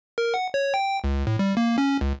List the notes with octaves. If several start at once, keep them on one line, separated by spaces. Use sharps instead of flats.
A#4
F#5
C#5
G5
C#2
A2
G3
A#3
C#4
C#2